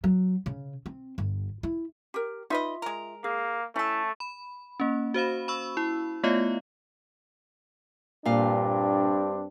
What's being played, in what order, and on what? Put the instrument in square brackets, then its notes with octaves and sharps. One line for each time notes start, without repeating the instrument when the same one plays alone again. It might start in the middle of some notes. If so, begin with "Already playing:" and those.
[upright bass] F#3
C#3
C4
G1
E4
[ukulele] G4 A#4
[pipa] D#4 B4 D#5 [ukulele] F4 E5
[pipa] G#3 A#4
[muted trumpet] A#3 [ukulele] G#4
[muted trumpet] A3 [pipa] C#4 A4 [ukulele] E4
[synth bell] B5
A#3 C#4
F#4 C5 F5 B5
B5 C#6 E6
E4
A3 B3 F4 C#5 D#5 F5
[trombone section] G2 C4 D4 [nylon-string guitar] A#2 F5